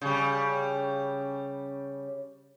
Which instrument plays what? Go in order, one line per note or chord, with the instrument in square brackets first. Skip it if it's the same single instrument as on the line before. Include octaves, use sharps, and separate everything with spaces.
[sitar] C#3 G3